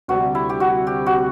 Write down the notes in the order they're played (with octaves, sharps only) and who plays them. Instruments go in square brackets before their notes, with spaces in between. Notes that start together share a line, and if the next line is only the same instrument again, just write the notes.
[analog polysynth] D2 C3 G3 [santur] F#4
[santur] E4
G4
F#4
G4
F#4